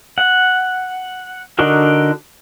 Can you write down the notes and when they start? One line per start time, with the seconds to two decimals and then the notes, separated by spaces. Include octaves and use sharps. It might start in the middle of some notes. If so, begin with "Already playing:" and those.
0.18 F#5
1.59 D3 D4 D#4 F#4 A#4